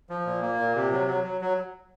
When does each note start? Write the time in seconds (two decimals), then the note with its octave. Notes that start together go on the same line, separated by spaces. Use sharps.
0.09 F3
0.26 A#2
0.42 A#3
0.59 A#2
0.76 C3
0.92 F#3
1.07 F#3
1.24 F#3
1.41 F#3